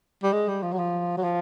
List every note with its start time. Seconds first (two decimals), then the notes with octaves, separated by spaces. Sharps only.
0.23 G3
0.33 G#3
0.48 G3
0.62 F3
0.72 F#3
0.78 F3
1.17 F#3
1.23 F3